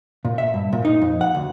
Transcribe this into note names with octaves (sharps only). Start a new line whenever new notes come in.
A#2
E5
G2
A#2
D#4
F2
F#5
D2